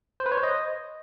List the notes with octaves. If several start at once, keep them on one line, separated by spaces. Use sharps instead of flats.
C5
B4
C#5
C5
D#5